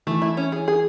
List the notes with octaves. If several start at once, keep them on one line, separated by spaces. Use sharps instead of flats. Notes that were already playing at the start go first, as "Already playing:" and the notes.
E3 A3
E4
C#4
G#4
G#4